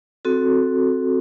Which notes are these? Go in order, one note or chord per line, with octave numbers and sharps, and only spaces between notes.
C4 F#4 A4